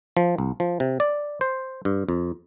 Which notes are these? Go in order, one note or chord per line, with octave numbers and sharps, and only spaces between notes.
F3
C2
F3
C3
D5
C5
G2
F2